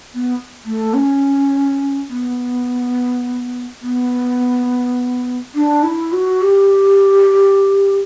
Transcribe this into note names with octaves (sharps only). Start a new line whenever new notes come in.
B3
A3
C#4
B3
B3
D4
E4
F#4
G4